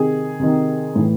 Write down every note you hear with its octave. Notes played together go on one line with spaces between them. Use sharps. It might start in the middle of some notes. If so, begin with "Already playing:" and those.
Already playing: C3 D#3 G#4
C3 D#3
A2 E3